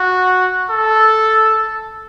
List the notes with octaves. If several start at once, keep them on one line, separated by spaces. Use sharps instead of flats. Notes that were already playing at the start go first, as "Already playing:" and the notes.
Already playing: F#4
A4